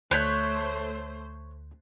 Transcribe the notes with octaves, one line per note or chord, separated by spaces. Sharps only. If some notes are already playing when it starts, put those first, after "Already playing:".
D2 A3 C5 C#5 F#6 G6 B6